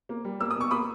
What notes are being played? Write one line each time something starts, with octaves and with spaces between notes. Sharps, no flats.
A#3
G3
A#3 E6
D#6
B2 C#6
A#3 B5 D#6